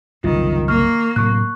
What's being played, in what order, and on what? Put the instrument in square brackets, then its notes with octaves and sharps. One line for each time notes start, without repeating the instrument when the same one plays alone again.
[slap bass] F#1 C2 [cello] D#3 [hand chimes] F4
[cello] A#3 [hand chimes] C#6 F6
[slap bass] A2 C3 F#3 [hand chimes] C#6 F#6